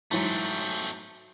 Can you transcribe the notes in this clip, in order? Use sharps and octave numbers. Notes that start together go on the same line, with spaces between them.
G#2 E3 F#3 A3 C4